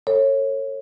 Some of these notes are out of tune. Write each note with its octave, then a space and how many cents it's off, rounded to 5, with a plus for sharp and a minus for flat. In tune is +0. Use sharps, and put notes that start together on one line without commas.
A4 +35 C#5 -20